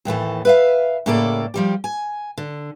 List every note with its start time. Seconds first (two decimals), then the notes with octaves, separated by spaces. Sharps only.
0.05 D#2 A2 E3 A3
0.45 B4 E5 F5
1.06 A2 C#3 A#3 A4 D5
1.54 F3 G3 G4
1.84 G#5
2.38 D3